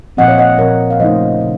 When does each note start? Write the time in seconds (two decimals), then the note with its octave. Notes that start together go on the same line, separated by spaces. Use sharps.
0.17 A#2 F3 C4 D#5 F#5
0.28 C#5 F5
0.38 D#5 F#5
0.58 A#2 F3 C4 A#4 C#5
0.90 F5
1.00 C#3 F3 A3 D#4 C5 D#5
1.41 C#3